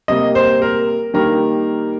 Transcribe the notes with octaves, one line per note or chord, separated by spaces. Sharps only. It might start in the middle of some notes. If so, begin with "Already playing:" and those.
C3 G3 A#3 D#5
C5
A#4
D#3 G3 A#3 A#4